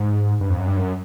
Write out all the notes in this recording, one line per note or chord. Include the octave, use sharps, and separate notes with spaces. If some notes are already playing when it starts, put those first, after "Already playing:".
Already playing: G#2
G2
F2
F#2
G2
F#2